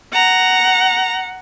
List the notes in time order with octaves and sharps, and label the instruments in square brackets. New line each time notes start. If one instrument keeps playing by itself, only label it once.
[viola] F#5 [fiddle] A#5